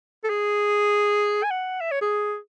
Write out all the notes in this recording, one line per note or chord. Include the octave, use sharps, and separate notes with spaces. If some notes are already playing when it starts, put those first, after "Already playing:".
A4
G#4
G#5
F#5
E5
C#5
G#4